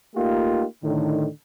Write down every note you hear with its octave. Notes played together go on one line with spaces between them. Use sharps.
A3 A#3 D#4 F4 G4
A2 D3 D#3